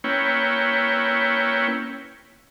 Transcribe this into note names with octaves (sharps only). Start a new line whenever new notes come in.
A#3 C#4 E4 B4 C#5 G5